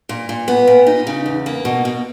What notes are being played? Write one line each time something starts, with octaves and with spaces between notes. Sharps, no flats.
A#2
A#2
B3
A#2
D#4
C#3
E2
A#3
B2
B2